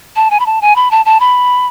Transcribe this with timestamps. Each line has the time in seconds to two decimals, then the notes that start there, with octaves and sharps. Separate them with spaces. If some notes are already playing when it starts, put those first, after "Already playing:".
0.16 A5
0.31 G#5
0.40 B5
0.46 A5
0.61 G#5
0.76 B5
0.91 A5
1.06 A5
1.20 B5